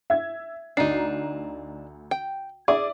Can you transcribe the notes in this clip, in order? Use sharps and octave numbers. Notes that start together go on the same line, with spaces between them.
E5 G#6
D2 D4 D#4 A#5 C7
G5
G#4 D5 E5